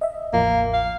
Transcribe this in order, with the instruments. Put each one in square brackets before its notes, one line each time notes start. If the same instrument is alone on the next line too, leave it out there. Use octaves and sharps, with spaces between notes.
[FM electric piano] D#5 E5
[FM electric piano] A1 E2 F3 [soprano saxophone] A#3
[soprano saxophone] F5